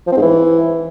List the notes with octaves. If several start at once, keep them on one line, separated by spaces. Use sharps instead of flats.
F3
C4
G#2
E3